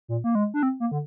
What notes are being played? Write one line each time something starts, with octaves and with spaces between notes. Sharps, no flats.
A#2
A#3
G#3
D4
C4
A#3
D3